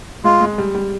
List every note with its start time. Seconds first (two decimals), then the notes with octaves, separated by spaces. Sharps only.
0.24 G#3 F4
0.41 G#3
0.58 G3
0.75 G3